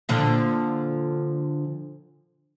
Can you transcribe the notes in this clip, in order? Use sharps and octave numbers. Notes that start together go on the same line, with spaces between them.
A#2 D3 F3